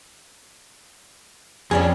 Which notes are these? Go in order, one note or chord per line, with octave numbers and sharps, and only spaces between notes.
F2 C#4 D4 G#4